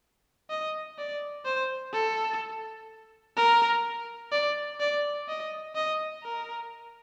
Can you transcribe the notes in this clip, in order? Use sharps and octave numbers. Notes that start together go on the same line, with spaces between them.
D#5
D5
C5
A4
A#4
D5
D5
D#5
D#5
A#4